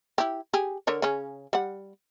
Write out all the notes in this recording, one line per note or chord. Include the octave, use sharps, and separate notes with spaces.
E4 G4
G4 G#4
D3 A#4 C#5
C#3 C#4
G3 F#5